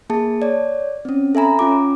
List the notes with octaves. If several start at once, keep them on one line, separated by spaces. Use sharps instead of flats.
A#3 G#4 A5
C#5 D5
C4 C#4
A4 E5 G#5 A#5 B5
C#4 F4 D6